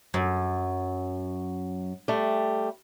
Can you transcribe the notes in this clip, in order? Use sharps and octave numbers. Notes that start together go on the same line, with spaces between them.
F#2
G3 A3